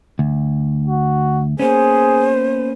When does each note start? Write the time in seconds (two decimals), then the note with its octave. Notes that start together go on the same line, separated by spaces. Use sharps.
0.19 D2
0.87 F#4
1.59 A#3 B3 C#4 G#4 C5